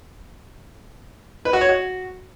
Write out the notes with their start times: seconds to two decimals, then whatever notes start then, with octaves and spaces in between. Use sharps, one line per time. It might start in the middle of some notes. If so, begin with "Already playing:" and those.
1.45 B4
1.53 F#4
1.61 C#5
1.69 F#4